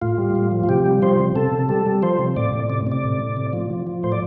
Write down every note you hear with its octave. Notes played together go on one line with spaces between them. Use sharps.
A2 F4
G3
A2
F3
F4
C3 G4
G3
F3 C5
C3
C3 A4
C3
G3 A4
G3
F3 C5
C3
A2 D5
A2
C3 D5
C3 D5
A2
A2
C3
F3
F3
F3
A2 C5
D5